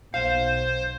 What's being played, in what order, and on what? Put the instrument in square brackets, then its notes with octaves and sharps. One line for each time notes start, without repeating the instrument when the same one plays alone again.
[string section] B1 [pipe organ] C5 [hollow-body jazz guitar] F5